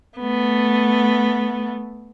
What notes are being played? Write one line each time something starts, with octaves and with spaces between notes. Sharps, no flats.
A3 B3